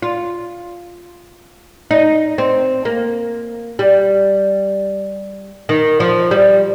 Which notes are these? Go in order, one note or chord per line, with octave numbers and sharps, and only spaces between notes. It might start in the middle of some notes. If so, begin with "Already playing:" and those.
F4
D#4
C4
A#3
G3
D#3
F3
G3